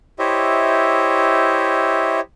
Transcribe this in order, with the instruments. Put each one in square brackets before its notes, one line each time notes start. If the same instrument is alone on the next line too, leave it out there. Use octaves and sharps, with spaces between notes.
[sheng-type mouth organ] E4 G4 C5 C#5 D#5 E5